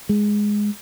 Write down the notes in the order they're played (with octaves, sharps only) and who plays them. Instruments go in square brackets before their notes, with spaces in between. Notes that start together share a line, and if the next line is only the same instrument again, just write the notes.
[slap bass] G#3